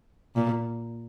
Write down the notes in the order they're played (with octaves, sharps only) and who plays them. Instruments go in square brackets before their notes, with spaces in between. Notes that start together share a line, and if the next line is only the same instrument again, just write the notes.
[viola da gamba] A#2